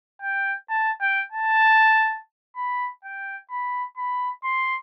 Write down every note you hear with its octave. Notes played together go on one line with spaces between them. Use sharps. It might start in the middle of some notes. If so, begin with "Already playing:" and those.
G5
A5
G5
A5
B5
G5
B5
B5
C6